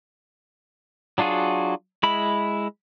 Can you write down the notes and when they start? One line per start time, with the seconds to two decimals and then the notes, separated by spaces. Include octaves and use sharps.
1.18 F#3 D4 F4 F#4 G#4
2.03 G#3 E4 B5